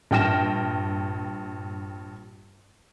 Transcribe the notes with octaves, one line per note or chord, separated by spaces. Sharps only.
A#1 G2 G5 F6 A#6 E7